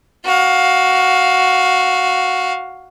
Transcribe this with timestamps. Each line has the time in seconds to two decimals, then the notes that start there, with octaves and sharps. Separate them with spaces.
0.25 F#4 F5